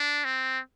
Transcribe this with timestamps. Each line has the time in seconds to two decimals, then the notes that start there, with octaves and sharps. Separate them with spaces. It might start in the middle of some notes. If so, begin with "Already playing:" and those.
Already playing: D4
0.25 C4